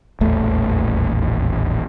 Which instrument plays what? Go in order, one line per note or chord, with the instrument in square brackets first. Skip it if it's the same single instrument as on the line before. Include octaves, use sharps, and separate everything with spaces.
[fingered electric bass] D#1 A1 E2 A3